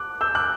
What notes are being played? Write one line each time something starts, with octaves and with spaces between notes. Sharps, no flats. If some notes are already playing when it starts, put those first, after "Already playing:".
Already playing: D6 F#6
E6 G6
D6 F#6